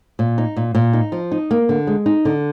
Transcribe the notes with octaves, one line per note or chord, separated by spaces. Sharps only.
A#2
D#4
A#2
A#2
D#4
F3
D#4
A#3
D3
G#3
D#4
D3